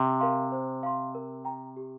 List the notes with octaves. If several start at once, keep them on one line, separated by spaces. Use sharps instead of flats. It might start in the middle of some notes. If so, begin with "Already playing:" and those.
Already playing: C3
A#4 F5 C6
C5
F5 C6
A#4
G5 A#5
G4